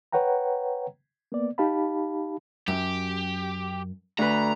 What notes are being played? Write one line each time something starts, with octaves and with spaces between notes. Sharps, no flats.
B4 C#5 F#5 G5 A#5
A#3 B3 D5
D#4 G4 F5 A5 B5
F#2 G4
D2 B4 A#5